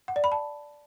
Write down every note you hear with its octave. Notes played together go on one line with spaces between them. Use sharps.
F#5
D5
B5
A5